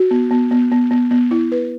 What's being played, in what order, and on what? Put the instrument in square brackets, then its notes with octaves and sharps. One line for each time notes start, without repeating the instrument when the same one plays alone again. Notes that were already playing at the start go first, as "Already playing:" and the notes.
Already playing: [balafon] F#4
B3
B3
B3
B3
B3
B3
E4
B4